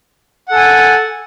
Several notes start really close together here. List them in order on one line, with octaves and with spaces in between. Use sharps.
F#5 A4 G#5